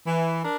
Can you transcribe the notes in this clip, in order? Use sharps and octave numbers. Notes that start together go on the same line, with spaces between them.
E3
D4 A#4